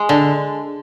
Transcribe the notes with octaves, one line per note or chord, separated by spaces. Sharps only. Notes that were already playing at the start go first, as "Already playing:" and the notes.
Already playing: G#3
D3